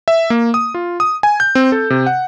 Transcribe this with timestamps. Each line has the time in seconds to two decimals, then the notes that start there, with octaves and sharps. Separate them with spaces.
0.08 E5
0.30 A#3
0.54 D#6
0.74 F4
1.00 D#6
1.23 G#5
1.40 G6
1.55 C4
1.72 A4
1.90 C3
2.07 F#5